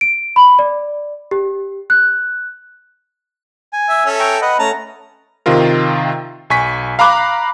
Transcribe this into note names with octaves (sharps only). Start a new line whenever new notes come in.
D7
B5
D5
G4
F#6
G#5
E5
C#4 A4 E5
G5 A#5 C#6
B4 D#5 F#5
A3 C#4 A5 A#5
C3 D#3 C4 F4 A#4
B1 G#5 C#6 B6
F5 A#5 B5 D6 F#6